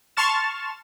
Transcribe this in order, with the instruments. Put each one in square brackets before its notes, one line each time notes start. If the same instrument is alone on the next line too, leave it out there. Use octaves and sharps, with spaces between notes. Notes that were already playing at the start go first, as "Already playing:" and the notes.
[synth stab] A5 C6 C#6 F6 A6 E7